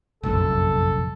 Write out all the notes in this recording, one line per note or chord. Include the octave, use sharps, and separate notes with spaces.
F1 A#1 F#2 A4